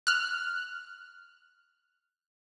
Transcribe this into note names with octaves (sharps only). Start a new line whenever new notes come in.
F6 F#6